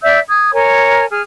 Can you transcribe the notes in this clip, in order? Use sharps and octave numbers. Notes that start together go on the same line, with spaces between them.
D5 E5 E6 G6
D#6 G#6
A#4 C#5 G#5
G#4 F6